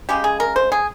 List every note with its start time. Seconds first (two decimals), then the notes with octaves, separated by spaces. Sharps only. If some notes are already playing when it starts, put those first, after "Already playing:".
0.09 C#3 G#3 G4
0.24 G#4
0.40 A#4
0.56 C5
0.72 G#4